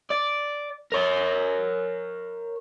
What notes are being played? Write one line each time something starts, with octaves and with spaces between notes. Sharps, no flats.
D5
A#4 C#5